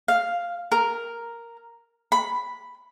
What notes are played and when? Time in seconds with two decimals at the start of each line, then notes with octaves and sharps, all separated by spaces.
0.08 F5
0.72 A#4
2.12 B5